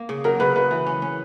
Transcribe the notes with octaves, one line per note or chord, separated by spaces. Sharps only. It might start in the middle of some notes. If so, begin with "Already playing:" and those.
Already playing: A#3
C#3
F#3 A#4
C#3 B4
C#3 B4
E3
C#4
C#4